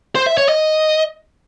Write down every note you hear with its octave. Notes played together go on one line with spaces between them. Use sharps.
C5
E5
C#5
D#5